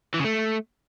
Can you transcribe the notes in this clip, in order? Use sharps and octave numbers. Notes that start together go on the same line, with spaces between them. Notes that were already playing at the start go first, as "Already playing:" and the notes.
E3
C#3
A3